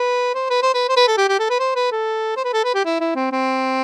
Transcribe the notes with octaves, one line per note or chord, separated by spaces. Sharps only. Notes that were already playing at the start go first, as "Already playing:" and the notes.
Already playing: B4
C5
B4
C5
B4
C5
B4
A4
G4
G4
A4
B4
C5
B4
A4
C5
B4
A4
B4
G4
E4
E4
C4
C4